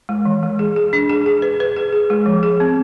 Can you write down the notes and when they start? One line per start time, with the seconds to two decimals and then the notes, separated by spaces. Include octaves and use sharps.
0.09 G#3
0.25 E3
0.43 G#3
0.59 G#4
0.76 G#4
0.93 D4
1.09 G#4
1.26 G#4
1.42 B4
1.60 B4
1.76 G#4
1.93 G#4
2.10 G#3
2.26 F3
2.43 G#4
2.60 C4